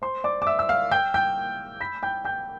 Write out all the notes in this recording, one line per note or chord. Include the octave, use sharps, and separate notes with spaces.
C5 C6
D5 D6
D6
E5 E6
E6
F5 F6
G5 G6
G5 G6
B5 B6
G5 G6
G5 G6